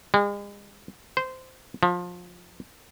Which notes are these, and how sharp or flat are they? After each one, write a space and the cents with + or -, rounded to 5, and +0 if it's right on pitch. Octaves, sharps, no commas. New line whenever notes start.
G#3 -40
C5 -15
F3 +25